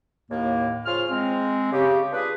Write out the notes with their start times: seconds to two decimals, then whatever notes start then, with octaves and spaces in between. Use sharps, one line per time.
0.30 D#2 A2 A#3
0.86 C#3 F3 F4 F6
1.10 G#3 C4
1.73 C#3 G4
2.13 D4 F4 G#4 B4